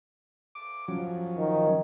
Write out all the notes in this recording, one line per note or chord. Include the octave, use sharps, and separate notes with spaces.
D6
F3 F#3 C#4
D#3